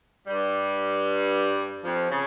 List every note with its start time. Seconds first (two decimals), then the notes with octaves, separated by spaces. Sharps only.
0.27 G2 G3
1.84 F2 F3
2.10 C#3